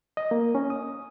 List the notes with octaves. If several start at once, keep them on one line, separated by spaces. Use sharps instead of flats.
D#5
A#3
C#4
D#6